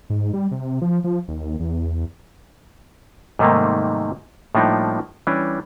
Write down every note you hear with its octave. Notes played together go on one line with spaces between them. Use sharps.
G#2
G3
C3
F3
F3
D#2
E2
G#2 C3 D#3 G3 A3 A#3
A2 F3 G3 A#3 D4 D#4
E3 G3 C#4 D4